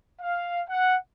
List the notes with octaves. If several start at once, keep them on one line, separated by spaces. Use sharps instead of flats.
F5
F#5